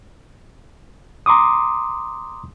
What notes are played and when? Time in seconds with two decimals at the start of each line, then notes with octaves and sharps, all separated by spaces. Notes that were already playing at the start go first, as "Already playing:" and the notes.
1.26 A#5 C6 D6 D#6